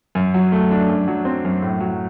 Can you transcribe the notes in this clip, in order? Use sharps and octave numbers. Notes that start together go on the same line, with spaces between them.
F#2
F#3
A3
D4
F#2
F#3
C4
F#2
A2
F#3